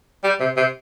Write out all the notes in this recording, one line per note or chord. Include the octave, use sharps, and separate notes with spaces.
G3
C3
C3